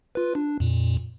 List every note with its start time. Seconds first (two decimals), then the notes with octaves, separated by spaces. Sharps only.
0.15 F4 B4
0.35 D4
0.60 F2 A#2